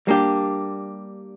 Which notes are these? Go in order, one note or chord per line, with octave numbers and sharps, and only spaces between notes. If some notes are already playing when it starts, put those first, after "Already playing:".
G3 A#3 D4 G4